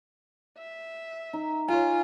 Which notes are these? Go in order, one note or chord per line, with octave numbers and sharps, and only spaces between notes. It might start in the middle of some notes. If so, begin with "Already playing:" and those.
E5
D#4
F4 C#5 G#5